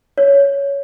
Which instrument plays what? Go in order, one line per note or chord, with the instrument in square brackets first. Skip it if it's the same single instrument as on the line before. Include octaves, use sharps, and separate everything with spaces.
[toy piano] C#5